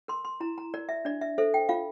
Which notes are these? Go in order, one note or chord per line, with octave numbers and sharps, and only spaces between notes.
A#4 C6
C6
E4 A#5
A#5
A#4 D5
E5
D4 D5
E5
A4 C5 E5
G5
F4 F5